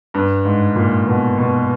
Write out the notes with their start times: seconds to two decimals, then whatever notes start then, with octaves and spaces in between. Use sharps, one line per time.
0.14 G2
0.45 G#2
0.76 A#2
1.07 B2
1.38 B2